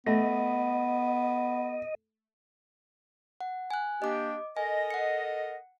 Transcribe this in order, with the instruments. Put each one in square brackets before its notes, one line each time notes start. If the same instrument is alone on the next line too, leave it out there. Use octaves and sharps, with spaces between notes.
[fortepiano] A3 [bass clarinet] B3 [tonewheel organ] D#5
[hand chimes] F#5
G#5 F#6
[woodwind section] A#3 D4 G4 [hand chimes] D#5 D6
[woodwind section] A4 A#4 D#5 [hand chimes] G#5
[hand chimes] F#5 C#7